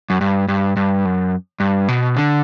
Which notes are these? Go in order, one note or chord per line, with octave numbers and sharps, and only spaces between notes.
F#2
G2
G2
G2
F#2
G2
B2
D3